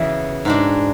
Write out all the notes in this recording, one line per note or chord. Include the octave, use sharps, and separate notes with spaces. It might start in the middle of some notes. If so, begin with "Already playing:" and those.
Already playing: C#3 E3 B3 F#4
G#2 G#3 D4 F#4